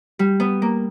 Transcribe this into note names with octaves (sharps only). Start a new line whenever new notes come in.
G3
B3
A#3